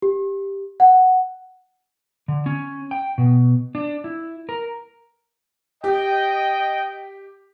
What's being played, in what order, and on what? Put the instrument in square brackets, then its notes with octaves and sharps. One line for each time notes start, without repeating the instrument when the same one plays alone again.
[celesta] G4
F#5
[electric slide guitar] D3
C#4
G5
B2
D4
E4
A#4
[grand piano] G4 [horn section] D#5 G5